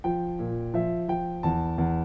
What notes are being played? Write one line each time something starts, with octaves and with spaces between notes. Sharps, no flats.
F3 G5
A#2
F3 E5
F3 G5
E2 A5
E2